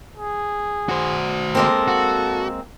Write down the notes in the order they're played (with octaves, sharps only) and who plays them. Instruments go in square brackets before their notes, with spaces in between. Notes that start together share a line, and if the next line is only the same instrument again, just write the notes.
[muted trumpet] G#4
[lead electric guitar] F#4 C5
[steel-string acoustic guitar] G#3 A#3 C4 [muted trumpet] A4
[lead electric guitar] F#4